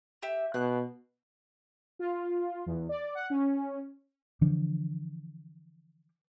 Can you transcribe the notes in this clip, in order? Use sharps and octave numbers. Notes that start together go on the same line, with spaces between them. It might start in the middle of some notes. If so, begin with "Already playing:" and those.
G4 E5
B2 F#6
F4
E2
D5
F#5
C#4
D3 E3 F3 D4